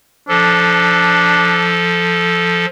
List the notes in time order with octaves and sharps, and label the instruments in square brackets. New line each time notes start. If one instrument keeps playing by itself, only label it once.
[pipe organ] F3 A4 [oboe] D4